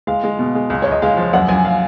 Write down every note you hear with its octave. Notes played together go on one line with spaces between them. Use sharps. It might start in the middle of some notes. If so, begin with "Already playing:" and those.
G#3 F5
G#3
B2
G#3
C#2
C#2 C#5
D#5
G#3 F5
F3
F#2 F#5
F#2 G#5
F5